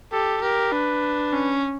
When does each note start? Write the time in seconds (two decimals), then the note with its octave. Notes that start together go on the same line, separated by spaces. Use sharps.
0.12 G4 A4
0.42 G4 A#4
0.72 D4 B4
1.33 C#4